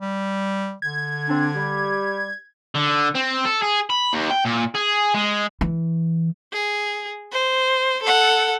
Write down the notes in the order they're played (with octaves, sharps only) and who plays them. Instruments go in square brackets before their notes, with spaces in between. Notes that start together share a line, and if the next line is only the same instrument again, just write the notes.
[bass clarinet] G3
[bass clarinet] D3 [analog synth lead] G#6
[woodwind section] C4 D4
G3 G4
[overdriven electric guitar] D3
C4
A4
G#4
B5
D#2
G5
A#2
G#4
G#3
[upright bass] E3
[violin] G#4
C5
A4 F#5